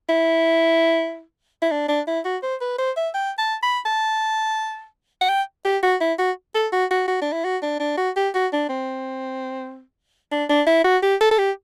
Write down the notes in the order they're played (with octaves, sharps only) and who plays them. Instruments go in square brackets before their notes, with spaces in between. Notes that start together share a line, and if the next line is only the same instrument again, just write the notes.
[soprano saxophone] E4
E4
D4
D4
E4
F#4
C5
B4
C5
E5
G5
A5
B5
A5
F#5
G5
G4
F#4
E4
F#4
A4
F#4
F#4
F#4
D4
E4
F#4
D4
D4
F#4
G4
F#4
D4
C4
D4
D4
E4
F#4
G4
A4
A4
G4